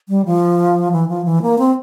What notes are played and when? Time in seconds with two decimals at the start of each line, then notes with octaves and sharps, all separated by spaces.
0.09 G3
0.26 F3
0.92 E3
1.08 F3
1.25 E3
1.42 A#3
1.58 C4